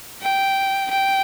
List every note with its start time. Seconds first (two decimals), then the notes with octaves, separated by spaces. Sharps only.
0.22 G5
0.90 G5